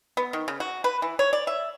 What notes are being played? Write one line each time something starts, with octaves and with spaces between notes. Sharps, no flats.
B3
D#3
C#3
F#4
B4
E3
C#5
D5
E5